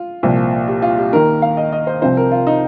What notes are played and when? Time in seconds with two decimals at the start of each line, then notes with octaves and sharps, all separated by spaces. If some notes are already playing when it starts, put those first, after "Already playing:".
Already playing: F4
0.23 C2 A#2 F3
0.68 G4
0.82 F4
0.98 G4
1.13 D#2 D#3 A#4
1.42 F5
1.57 D#5
1.72 D#5
1.87 C5
2.02 C2 C3 F3 C5
2.17 A#4
2.32 F4
2.47 D#4